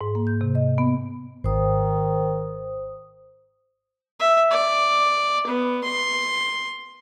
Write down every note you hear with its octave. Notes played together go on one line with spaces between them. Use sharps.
G#2
A#3
G6
C3
D#5
B3
G#1 D#3 C5 D#6
E5
D5
B3
C6